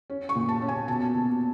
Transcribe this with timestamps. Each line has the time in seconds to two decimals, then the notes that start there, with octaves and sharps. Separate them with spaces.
0.10 C#4
0.29 C#6
0.36 A#2
0.49 A5
0.62 C#4
0.68 G#5
0.88 B2 A5
1.14 B2